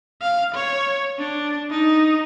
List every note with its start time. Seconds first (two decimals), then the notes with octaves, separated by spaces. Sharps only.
0.22 F5
0.55 C#5
1.19 D4
1.70 D#4